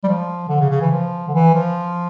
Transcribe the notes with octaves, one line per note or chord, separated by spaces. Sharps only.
G3
F3
D3
C#3
C#3
E3
F3
D3
E3
F3